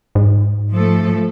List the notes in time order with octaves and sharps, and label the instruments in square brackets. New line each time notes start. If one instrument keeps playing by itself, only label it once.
[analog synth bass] G#2
[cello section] F3 A3 A4